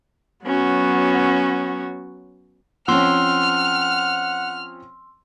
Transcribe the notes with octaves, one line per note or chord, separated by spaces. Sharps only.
F#3 B3 C#4 F#4
F3 C4 C#4 F#5 C6 E6 F6